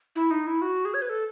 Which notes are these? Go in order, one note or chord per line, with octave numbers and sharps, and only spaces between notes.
E4
D#4
E4
F#4
G#4
C#5
B4
A4